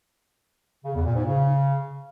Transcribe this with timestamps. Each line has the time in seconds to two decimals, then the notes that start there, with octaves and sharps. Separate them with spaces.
0.85 C#3
0.95 E2
1.05 A#2
1.15 G#2
1.25 C#3